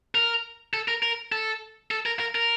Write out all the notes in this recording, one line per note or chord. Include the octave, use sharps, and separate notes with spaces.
A#4
A4
A#4
A#4
A4
A4
A#4
A#4
A#4